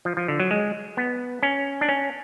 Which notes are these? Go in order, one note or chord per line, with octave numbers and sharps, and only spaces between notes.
F3
F3
D3
F#3
G#3
B3
C#4
D4
C#4